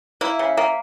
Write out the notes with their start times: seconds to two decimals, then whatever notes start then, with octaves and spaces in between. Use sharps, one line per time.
0.21 A#3 E4
0.39 C#3
0.57 A#3